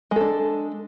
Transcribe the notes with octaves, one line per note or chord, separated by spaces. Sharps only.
G#3 D4 A4